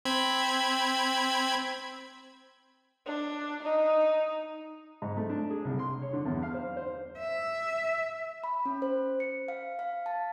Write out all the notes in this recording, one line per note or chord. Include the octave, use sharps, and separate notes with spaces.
C4 B5 G#6
D4
D#4
G#2
A3
D4
G#4
C2
C6
C#5
D3
E2
F5
C5
C5
E5
B5
C#4
C5
C#7
F5
F5
A5